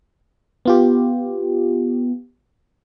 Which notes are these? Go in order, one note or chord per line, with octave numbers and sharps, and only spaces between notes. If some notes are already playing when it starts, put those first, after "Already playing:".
B3 F4 G4